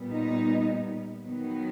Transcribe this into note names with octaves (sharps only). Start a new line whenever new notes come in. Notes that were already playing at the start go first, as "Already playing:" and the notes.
Already playing: A#2 G3 B3
D#4
D#3 F#3 B3